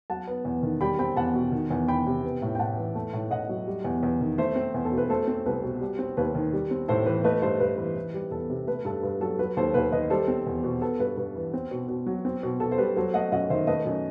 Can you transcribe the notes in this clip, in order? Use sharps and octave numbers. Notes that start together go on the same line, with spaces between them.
F#3 F#5 A5
B3
E2
D#3
G3 G5 B5
C4 G5 B5
E2 F#5 A5
B2
D#3
E2
E2 G5 B5
C3
B3
A2
G5
A2 F#5 A5
E3
A3
A2
A2 D#5 F#5
F#3
G3
E2
E2
D#3
A3 C5 E5
C4
E2
A4
B2
B4
A3 A4 C5
C4
C2 B4
B2
G3
C4
D#2 B4
D#3
G3
C4
A2 A4 C5
E3 B4
A3 B4 D#5
G2 A4 C5
G2 B4
E3
E3
G3
E2 A4
C3
A3 B4
G2 A4
G2 B4
F#3 A4
F#3 B4
D#2 A4 C5
D#2 B4
D#3 B4 D#5
G3 A4 C5
C4
E2
B2
B3 A4
G2 B4
G2 B4
E3
C4
B2
B2
F#3
C4
B2
B2 A4
C5
G3 B4
F#3 A4 C5
A3 D#5 F#5
F#2 D#5 F#5
D#3 C5 E5
A3 B4 D#5
F#2